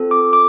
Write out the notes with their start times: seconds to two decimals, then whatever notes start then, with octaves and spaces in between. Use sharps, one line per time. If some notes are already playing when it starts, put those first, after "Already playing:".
Already playing: C4 F4 A4
0.11 D6
0.33 D6